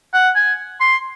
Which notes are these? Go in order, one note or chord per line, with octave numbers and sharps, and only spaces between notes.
F#5
G#5
C6